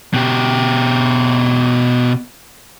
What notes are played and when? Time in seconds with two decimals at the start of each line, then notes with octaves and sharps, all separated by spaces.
0.14 B2 G4